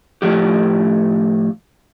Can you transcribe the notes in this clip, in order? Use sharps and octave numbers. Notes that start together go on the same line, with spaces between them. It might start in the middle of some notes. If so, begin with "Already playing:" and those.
A2 F3 G4